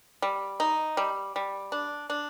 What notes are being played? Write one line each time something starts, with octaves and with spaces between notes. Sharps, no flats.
G3
D#4
G3
G3
D4
D4